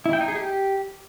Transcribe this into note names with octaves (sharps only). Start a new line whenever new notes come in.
E4
G5
D#4
G#4
G4